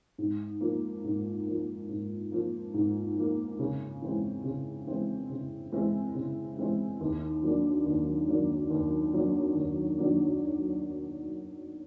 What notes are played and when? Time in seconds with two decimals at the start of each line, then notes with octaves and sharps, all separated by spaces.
0.18 G#2
0.61 F3 A#3
1.04 G#2
1.47 F3 A#3
1.89 G#2
2.32 F3 A#3
2.74 G#2
3.17 F3 A#3
3.59 C#3
4.02 E3 G#3 C4 E4
4.44 C#3
4.87 E3 G#3 C4 E4
5.29 C#3
5.72 E3 G#3 C4 E4
6.15 C#3
6.58 E3 G#3 C4 E4
7.01 D#2
7.42 D#3 F#3 A#3 D4
7.86 D#2
8.28 D#3 F#3 A#3 D4
8.71 D#2
9.12 D#3 F#3 A#3 D4
9.55 D#2
9.98 D#3 F#3 A#3 D4